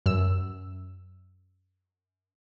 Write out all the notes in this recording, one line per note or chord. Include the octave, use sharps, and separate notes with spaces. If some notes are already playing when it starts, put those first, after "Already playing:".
F#2 E6